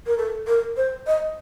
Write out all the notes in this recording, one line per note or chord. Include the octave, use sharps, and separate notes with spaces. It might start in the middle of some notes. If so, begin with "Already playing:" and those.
A#4
A4
A#4
C5
D#5